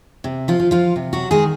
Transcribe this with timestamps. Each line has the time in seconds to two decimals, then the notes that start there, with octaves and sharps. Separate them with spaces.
0.24 C3
0.48 F3 F4
0.60 F3
0.71 F3 F4
0.96 C3
1.13 F#3 F#4
1.31 D#3 G#3 G#4